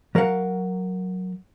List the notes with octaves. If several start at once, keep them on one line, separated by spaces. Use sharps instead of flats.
F#3 A#4 F5 F#5